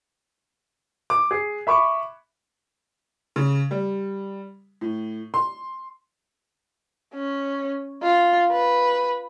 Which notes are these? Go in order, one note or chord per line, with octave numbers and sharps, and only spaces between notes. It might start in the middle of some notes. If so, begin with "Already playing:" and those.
D6
G#4
E5 B5 C#6 D6
C#3
G3
A2
C6
C#4
F4
B4